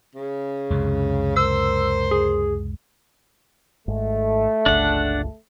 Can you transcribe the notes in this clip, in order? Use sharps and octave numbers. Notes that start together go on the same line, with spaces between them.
C#3
C#2 F#2 C3
A#4 C5 E6
G#4
G#1 G#2 A3
G1 C#2 D4 F#5